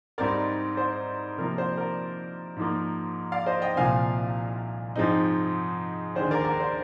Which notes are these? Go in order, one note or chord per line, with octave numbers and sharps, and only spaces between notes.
G#2 G3 C4 D#4 A#4 D5
C5
C3 F3 A#3 A#4
C5
A#4 D5
G#2 F3 A#3
D5 F5
C5 D#5
D#5 G5
C2 A#2 F3 C4 F5 G#5
G#2 F3 G#3 C4 D#4
D#2 D3 G#3 C5
A#4 D5
A#4 D5
C5